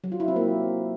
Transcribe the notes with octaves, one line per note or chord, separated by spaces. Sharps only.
F#3
F4
E4
C4
A#3